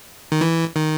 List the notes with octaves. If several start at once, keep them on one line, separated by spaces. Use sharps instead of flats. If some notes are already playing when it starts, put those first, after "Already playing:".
D#3
E3
D#3